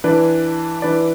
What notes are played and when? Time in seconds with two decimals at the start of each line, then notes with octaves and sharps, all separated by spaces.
0.04 E3 D4 B4 D5
0.82 E3 D4 B4 D5